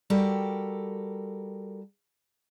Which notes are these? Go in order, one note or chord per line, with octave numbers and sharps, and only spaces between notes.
G3 F#4 G4 A4 A#4